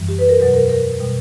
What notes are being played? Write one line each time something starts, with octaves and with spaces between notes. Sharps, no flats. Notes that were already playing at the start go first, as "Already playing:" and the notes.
Already playing: F#2 E3 G3
G4
B4
A#4
E2 B2 F#3 B4
A#4
A#4
B2 G3